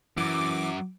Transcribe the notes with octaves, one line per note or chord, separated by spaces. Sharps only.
F#2 E3 D6